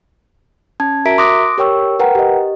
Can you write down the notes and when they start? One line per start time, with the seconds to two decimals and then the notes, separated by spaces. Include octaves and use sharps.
0.80 C#4 A5 G#6
1.05 F#4 A#4 E5 A#5 B6 D7
1.18 C6 D6 D#6 F#6 A#6 D7
1.58 G4 A#4 C#5 G5 C#6 E6
1.99 A#4 B4 F#5 G5 A#5
2.15 G4 D#5